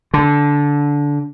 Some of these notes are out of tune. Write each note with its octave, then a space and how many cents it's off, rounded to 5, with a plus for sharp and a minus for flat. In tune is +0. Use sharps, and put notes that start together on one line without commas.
D3 -15